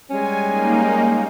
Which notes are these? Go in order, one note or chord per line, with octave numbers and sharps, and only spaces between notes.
G3 G#3 C#4 G#5
A#3 D#4